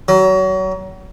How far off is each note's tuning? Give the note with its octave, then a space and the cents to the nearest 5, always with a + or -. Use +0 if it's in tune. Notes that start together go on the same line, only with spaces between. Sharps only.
F#3 +30